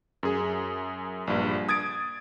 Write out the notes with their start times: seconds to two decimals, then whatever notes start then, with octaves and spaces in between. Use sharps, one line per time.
0.23 F#2 G#4
1.27 A#1 G2
1.69 D#6 G#6 A6 D7